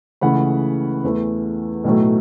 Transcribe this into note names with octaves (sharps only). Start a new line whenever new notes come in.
C#2 C#3 E3 A3 F#5 B5
E2 E3 A3
B1 A2 F#3 A3